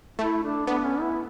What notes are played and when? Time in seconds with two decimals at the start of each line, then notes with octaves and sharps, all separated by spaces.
0.19 A3 E4
0.43 D4
0.67 B3 D4
0.84 C#4
1.01 E4